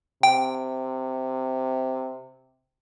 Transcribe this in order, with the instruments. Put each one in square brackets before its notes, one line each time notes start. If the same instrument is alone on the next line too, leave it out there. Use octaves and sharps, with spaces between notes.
[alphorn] C3 [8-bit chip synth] G5